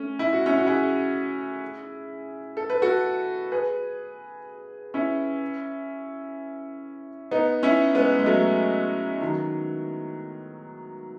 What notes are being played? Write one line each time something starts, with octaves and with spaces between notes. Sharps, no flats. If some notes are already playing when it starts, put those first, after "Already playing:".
Already playing: A3 C#4
E4
F#4
C#4 E4
F#4
E4 G#4
A4
B4
F#4 A4
G#4 B4
C#4 E4
B3 D#4
C#4 E4
G#3 B3
G#3
F#3 A3
D#3 F#3